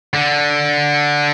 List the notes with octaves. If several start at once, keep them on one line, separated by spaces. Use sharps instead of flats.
D3